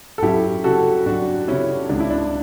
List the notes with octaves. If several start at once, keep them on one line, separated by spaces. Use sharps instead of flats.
A4
F#2 E4 G4
C#3 G3 F#4 A4
F#2 D4 F#4
C#3 G3 C#4 E4
C#2 D4
E4
D4